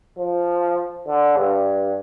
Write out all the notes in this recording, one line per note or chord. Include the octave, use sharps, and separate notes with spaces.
F3
D3
G2